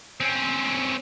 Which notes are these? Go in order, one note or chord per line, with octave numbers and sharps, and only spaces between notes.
C4 C#4